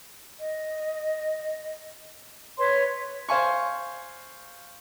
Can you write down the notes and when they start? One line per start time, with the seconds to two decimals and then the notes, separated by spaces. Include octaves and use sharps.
0.40 D#5
2.57 B4 C#5 C6
3.29 C5 F5 G#5 C#6